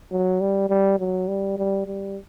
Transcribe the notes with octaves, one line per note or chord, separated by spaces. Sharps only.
F#3
G3
G3
F#3
G3
G3
G3